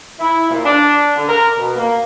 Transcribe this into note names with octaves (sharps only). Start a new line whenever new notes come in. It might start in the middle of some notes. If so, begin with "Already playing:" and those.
E4
A#2
D4
D3
A#4
B2
A#3